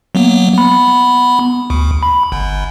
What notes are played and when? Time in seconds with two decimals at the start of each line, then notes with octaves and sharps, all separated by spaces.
0.15 F#3 A#3 B3
0.53 B3 B5
1.70 D2
2.03 B5
2.32 G1